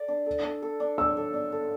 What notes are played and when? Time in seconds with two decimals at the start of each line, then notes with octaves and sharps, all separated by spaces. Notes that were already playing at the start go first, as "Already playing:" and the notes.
Already playing: A4 D5
0.08 D4
0.26 A4
0.44 D4
0.62 A4
0.80 D4
0.98 D4 E6
1.17 A4
1.34 D4
1.52 A4